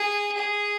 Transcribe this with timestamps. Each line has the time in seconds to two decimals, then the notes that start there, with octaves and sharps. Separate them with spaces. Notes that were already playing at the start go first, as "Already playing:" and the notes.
Already playing: G#4
0.37 G#4